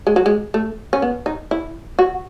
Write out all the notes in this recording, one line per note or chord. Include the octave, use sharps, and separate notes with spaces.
G#3
F#3
G#3
A3
C#4
B3
D#4
E4
F#4